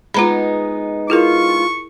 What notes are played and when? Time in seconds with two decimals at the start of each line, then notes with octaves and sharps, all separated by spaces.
0.14 G#3 B3 D#4 F4 A#5 B5
1.10 E4 F4 G#4 A#4 C#6